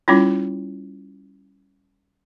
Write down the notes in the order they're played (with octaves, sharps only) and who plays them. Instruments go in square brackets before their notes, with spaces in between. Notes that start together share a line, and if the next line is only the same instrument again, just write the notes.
[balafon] G3 C#4 E4 F4